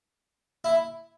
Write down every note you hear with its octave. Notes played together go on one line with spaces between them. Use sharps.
E4